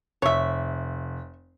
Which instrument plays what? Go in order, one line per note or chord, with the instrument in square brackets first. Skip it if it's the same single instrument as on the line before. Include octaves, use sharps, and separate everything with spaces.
[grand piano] F1 [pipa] C#5 E5